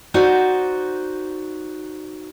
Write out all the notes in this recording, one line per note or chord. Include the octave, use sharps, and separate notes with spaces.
D#4 F#4 C5 D5